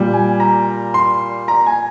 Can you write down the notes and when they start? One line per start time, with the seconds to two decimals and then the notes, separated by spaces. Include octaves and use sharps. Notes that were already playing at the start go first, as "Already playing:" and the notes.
Already playing: A#2 G3
0.13 G#5
0.40 A#5
0.94 C6
1.48 A#5
1.66 G#5